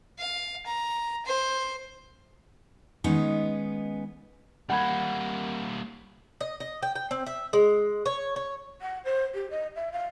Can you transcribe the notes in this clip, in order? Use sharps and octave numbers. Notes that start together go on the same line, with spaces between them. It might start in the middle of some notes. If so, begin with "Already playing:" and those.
F5
A#5
C5
D#3 G#3 B3 C#4 D#4
G3 A#3 F#5 B5 G#6
D#5
D#5
G5
G5
C4
E5
G#3
C#5
C#5
F#5
C5
G4
D#5
E5
F5